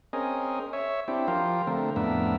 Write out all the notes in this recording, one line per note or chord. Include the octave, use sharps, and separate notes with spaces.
C4 C#4 G#4 A#4 D#5
C#5 E5
C4 D4 E4 G4
F3 F4 G4 A#4 C5
D3 A3 C4 A#4
F2 A2 B3 D4 A#4 E5